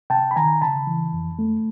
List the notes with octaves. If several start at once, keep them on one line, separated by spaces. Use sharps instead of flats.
C3 G5 A5
B5
D#3 G#5 A#5
C#3 A5 B5
E3
F2
A3